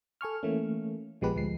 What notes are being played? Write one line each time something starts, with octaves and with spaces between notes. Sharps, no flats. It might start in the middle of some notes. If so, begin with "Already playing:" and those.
A4 G#5 C#6 F6
E3 A3 A#3 C#4
A#1 F3 G#3 B3 G4 B4
D2 F3 G#3 C7